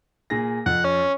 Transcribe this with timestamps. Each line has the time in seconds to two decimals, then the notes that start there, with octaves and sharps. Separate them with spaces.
0.30 A#2 G#4 A#6
0.66 F2 F#5
0.84 C#4